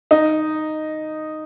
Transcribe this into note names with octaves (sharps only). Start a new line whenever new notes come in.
D#4